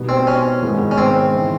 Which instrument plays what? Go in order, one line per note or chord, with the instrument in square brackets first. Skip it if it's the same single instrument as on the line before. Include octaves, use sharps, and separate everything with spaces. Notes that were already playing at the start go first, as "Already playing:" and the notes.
Already playing: [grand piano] B2 G3 B3 D#4
[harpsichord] C4
C#4
[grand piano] G#2 D#3 G#3 B3 D#4
[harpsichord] C#4
C4
[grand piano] C#3 E3 G#3